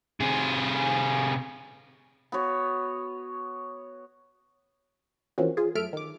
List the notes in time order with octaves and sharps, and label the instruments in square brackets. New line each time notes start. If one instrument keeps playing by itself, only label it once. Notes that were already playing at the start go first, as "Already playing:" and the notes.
[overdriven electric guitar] C3 G#4
[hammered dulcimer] B3 F#4 C#5
[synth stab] E3 F3 A#3 C4 C#4 F#4
F4 G#4
F#2 A3 A4 E5 F6 D7
D#3 D6